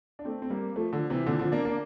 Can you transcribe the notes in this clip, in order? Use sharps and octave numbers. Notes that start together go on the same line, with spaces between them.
D4
A3 C4
C4
G3 A#3
F3 A3
D3 F3
C3 E3
A#2 D3
D3 F3
A#3 D4
A#3 D4